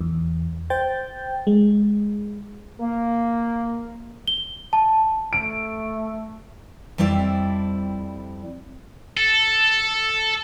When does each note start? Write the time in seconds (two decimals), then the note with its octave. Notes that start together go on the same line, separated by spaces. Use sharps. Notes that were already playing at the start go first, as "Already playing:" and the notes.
0.01 E2
0.70 C5 G5 G6 A6
1.47 G#3
2.80 A#3
4.28 G7
4.73 A5
5.33 A3 D7
6.98 F2 G3 C4 E4 D5
9.17 A4